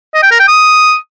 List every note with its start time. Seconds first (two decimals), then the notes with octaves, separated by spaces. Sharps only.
0.15 D#5
0.23 G5
0.31 A#4
0.40 G5
0.48 D#6